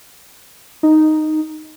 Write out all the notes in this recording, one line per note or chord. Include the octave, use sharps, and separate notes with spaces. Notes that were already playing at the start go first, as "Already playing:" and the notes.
D#4